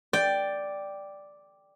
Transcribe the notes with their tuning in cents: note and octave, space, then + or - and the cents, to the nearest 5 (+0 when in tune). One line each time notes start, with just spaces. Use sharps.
D5 +0 G5 +0